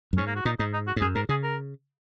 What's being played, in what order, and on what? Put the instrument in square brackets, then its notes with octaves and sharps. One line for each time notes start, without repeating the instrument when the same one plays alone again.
[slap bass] F#2
[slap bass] G#2 [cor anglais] C#4
[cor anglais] A#3
F#4
[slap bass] A#2 [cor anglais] D#4
[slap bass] G#2 [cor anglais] D#4
[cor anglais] D#4
F#4
[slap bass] G#2
[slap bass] F#2 [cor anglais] G#4
[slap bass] G#2 [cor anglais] A#4
[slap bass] C#3 [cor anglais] G#4
[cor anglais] A#4